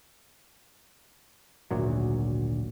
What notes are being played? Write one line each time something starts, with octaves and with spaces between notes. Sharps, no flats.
G#1 D2 A#2 F#3